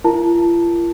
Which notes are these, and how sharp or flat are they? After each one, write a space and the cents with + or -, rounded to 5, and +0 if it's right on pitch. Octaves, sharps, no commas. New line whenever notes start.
F4 -45 A#4 +0 A5 +0